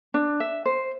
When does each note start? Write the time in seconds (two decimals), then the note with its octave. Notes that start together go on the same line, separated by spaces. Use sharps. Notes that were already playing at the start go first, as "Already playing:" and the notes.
0.14 D4
0.40 E5
0.66 C5